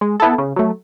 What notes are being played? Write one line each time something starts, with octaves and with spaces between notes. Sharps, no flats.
G#3
B3 E4 A4
C#3
F#3 A3